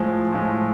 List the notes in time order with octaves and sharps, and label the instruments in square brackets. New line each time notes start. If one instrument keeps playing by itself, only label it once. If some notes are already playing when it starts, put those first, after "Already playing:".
Already playing: [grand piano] A2 F3 G#3
A2 F3 G#3